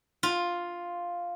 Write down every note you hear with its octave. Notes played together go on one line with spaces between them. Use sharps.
F4